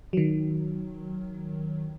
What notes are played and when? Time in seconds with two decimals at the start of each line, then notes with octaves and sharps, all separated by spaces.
0.13 D#3 F#3